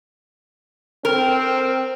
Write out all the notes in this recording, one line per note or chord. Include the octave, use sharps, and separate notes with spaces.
C4 A#4